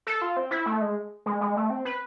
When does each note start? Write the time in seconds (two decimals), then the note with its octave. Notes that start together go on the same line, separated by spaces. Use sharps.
0.07 A4
0.22 F4
0.37 C4
0.51 E4
0.66 A3
0.81 G#3
1.26 G#3
1.41 G#3
1.56 A3
1.70 C4
1.85 B4